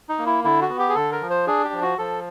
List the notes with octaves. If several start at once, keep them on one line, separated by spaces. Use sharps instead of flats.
D#4
A#3
E4
D3 E4
F#4
B3
G4
G#4
D3 A4
A#4
F3
C5
D4 G#4
G4
F3
F#4
F3 A4